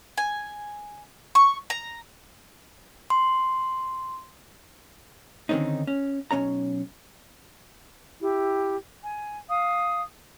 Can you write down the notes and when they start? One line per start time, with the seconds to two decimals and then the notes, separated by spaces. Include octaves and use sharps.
0.17 G#5
1.35 C#6
1.70 A#5
3.10 C6
5.49 D3 D#3 G#3 C4 C#4 D#4
5.87 C#4
6.31 B1 E3 C#4 C#5 A#5
8.21 E4 G4
9.03 G#5
9.48 F5 D#6